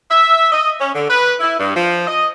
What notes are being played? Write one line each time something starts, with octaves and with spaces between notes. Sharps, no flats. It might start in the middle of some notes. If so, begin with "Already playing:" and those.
E5
D#5
C#4
D3
B4
E4
G2
F3
D#5